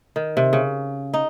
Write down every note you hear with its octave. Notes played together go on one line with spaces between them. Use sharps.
D#3
C3
C#3
D#4